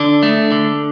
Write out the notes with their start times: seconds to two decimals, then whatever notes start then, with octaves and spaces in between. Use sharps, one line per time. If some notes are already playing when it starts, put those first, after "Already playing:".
Already playing: D3 D4
0.23 A3
0.52 D3